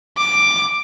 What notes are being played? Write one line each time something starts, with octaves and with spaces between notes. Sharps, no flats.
D6